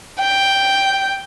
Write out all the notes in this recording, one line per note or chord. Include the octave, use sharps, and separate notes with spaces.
G5